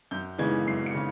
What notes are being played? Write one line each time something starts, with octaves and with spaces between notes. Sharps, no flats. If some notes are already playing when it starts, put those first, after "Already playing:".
F#2 G6
C#3 E3 G#3 B3 G#6
F#2 C7
C#7
C#3